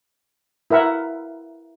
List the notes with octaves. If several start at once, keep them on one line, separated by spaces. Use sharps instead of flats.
E4 A#4 E5 F#5